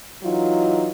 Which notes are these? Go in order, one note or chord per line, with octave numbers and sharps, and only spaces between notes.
E3 F#3 D#4 F4